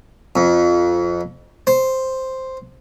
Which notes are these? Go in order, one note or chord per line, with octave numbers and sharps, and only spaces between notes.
F2
C5